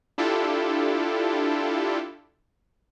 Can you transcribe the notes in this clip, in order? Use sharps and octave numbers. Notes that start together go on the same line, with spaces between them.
D4 E4 F4 G4 A4